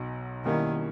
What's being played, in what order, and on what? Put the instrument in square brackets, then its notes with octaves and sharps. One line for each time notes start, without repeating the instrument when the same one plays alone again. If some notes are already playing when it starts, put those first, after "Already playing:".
Already playing: [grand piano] B1 B2 F#3
[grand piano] B2 G3 A#3 C#4 E4 [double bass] D#3